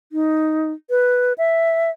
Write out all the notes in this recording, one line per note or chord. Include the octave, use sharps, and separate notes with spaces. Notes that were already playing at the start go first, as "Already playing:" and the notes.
D#4
B4
E5